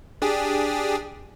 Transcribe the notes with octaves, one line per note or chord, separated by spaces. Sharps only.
D4 G4 G#4